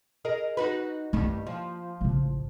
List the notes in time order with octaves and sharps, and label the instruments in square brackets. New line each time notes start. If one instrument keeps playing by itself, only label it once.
[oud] G#4 A#4 D#5
D#4 F#4 B4
[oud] G2 D#3 G3 [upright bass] A#3 E4
[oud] F3
[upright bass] A1 C#3